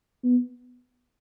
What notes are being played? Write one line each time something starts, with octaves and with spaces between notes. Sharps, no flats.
B3